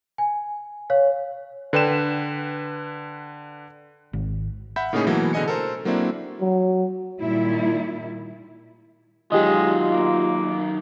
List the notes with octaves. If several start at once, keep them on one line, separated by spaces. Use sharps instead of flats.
G#5
C#5 F5
D3 B4 G5 E7
G#1
E5 F#5 B5 G6 B6
A2 C#3 A#3 C#4 D#4 G#4
B2 E3 F#3 A3 A#3
B2 D3 G#4 D#5 G#5 C#7
A4 A#4 C5
F#3 A#3 C4 D4 E4
F#3
A#2 D#3 G3 E4
D#3 F#3 G#3 F4 G4 D#5
A#3